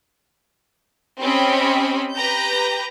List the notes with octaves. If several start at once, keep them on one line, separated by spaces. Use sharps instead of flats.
C4 C#4 G4 D#5 B5
G4 B4 A#5 G6